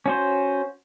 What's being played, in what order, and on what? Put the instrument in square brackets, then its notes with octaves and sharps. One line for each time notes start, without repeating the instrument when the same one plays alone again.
[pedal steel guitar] C#4 F#4 C5